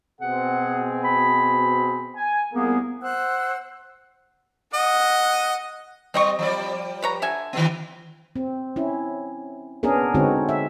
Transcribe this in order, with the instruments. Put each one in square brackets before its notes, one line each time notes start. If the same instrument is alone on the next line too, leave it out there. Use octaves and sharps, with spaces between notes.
[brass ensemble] B2 C4 G#4 [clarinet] F#5
[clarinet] B5
[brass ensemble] G#5
[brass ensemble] C2 A#3 G#4 [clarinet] B3
[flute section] C5 E6 F#6 [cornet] F#5
[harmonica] D#5 [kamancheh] F#5
[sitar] G3 [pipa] C4 D#5 C#6
[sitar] F3 G3 D5
[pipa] B4 C#5 A#5
D3 E5 G#5
[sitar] D#3 G3 B3
[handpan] C4
C#4 E4
B3 C#4 D4 G#4 A#4
D3 G#3 C4 C#4 D#4 F#4
E5